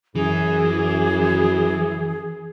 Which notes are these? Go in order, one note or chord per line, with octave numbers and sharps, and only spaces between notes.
F#2 E3 G#4